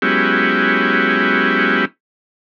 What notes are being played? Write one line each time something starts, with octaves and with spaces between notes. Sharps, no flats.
F#3 G#3 B3 C#4 E4 G4